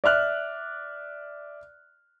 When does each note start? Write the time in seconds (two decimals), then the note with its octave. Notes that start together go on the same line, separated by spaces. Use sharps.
0.04 D5 E5 F6 F#6